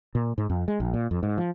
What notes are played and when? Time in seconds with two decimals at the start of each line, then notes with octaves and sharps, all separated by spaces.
0.15 A#2
0.38 G#2
0.50 F2
0.68 G#3
0.80 A#1
0.94 A#2
1.11 F2
1.23 G#2
1.38 F3